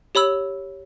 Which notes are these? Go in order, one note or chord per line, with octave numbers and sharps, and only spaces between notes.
G4 C#5 B5 E6